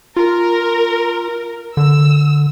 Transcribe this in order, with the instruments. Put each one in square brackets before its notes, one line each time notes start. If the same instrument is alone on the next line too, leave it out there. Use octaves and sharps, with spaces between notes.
[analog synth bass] F4 [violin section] A#4
[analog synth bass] D3 [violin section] E6